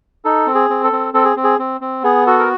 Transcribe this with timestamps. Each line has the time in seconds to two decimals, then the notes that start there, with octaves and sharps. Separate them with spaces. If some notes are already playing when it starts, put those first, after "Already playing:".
0.25 D#4 A4
0.47 C4
0.55 G#4
0.70 C4
0.84 A4
0.92 C4
1.14 C4 A4
1.25 G#4
1.36 C4
1.44 G#4
1.59 C4
1.81 C4
2.03 B3 G#4
2.27 F#4 A4
2.39 A#4